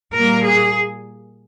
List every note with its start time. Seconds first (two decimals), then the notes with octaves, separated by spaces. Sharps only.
0.14 A#2 G3 A#3 A#4
0.43 G#4